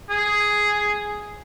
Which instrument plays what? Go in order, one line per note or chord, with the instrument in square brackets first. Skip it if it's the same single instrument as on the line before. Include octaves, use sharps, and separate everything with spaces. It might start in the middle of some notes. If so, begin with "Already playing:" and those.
[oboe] G#4